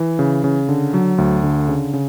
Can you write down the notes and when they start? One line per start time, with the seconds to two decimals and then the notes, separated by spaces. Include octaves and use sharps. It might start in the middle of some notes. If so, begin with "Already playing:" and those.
Already playing: E3
0.19 C#3
0.44 C#3
0.69 D3
0.94 F#3
1.18 D2
1.43 D3
1.68 C#3
1.93 C#3